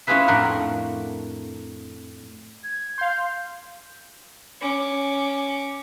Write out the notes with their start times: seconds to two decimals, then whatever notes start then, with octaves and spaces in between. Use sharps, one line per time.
0.07 C#4 E4 F4 G#4 B4 E5
0.28 F2 A2 D4 A#4 F#5
2.64 G#6
2.98 F5 C6 G6
4.61 C#4 D6